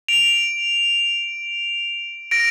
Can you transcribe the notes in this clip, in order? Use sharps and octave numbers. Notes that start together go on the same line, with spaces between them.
D7 F7
A#6 D7